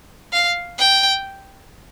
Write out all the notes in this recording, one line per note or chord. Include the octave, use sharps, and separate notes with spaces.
F5
G5